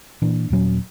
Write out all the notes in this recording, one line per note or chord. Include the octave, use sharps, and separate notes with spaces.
A#2 E3 A#3 D4
D#1 A#2 F#3 C#4